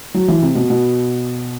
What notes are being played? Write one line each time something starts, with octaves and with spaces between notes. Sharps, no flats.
F#3
E3
C3
B2
B2